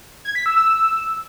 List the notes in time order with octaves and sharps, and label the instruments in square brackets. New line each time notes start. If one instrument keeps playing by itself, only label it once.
[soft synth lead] G#6
B6
E6
E6